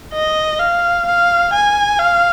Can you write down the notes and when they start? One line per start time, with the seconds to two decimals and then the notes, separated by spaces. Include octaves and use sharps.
0.13 D#5
0.60 F5
1.06 F5
1.53 G#5
1.99 F5